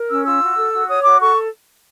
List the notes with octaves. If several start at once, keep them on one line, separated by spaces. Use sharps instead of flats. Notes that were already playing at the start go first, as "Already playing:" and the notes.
Already playing: A#4
C#4 E6
F4 E6
F#4
A4
F#4
C#5 D#6
F#4 D6
A4 C#6